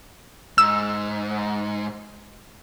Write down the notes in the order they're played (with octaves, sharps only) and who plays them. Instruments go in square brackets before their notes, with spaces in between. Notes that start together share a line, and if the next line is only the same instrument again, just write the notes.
[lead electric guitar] G#2 [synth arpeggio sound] E6